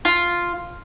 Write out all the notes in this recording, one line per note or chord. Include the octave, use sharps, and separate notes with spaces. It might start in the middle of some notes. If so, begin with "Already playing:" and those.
F4